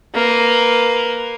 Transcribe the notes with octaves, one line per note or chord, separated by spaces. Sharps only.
A#3 B4